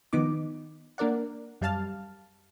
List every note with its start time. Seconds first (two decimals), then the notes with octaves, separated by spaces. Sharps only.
0.13 D#3 F3 B3 D#4 D6
0.98 A#3 D4 A#4 D5 F#5
1.61 F#2 G3 F5 A5 F6 A6